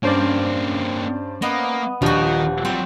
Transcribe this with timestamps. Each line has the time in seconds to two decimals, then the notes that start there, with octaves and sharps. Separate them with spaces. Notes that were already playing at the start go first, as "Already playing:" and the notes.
0.03 G2 A#3 C4 C#4 C5 D5
1.42 A#3 B3 D#5
2.02 D#1 D#3 F3 D4 D#4 F#4
2.65 F#3 G3 C4